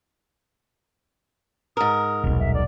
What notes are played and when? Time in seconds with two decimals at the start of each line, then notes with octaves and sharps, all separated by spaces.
1.77 G#2 A#4 D#6
2.24 D#1 B1
2.39 E5
2.54 D5